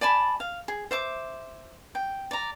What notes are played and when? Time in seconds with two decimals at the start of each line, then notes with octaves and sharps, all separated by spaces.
0.01 D5 G#5 A5 B5
0.40 F5
0.68 G#4
0.91 C5 E5 D6
1.95 G5
2.31 D5 A#5